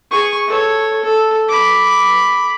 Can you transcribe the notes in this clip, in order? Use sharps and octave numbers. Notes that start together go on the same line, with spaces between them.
G#4 C#6
A4 C#5
A4
B5 D6